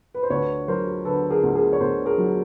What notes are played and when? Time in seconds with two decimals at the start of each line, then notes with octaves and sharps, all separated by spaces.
0.15 B4
0.23 C5
0.30 D2 B4 C#5
0.68 F#3 A#4 C5
1.05 D3 A4 B4
1.30 G#4 A#4
1.43 D2
1.55 G#4 A#4
1.73 C#5
1.80 D2 A#4 C5
2.06 G#4 A#4
2.18 F#3